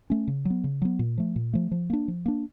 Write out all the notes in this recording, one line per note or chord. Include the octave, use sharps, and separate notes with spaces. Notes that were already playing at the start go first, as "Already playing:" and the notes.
A3 C#4
C#3
F#3 B3
C#3
F#3 B3
A#2
F3 A3
A#2
F3 A3
F3
A#3 D4
F3
A#3 D4